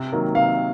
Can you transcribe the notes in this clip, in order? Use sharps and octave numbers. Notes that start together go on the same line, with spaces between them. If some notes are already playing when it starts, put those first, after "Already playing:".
Already playing: C3
D#3 F#3 A#3
C3 F5